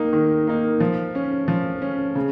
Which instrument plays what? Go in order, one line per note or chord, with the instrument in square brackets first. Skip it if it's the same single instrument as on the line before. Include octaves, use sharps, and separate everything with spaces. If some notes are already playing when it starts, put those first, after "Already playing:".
Already playing: [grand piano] D#3 A#3 D#4
D#3
A#3 D#4
F3
C#4
F3
C#4
C#3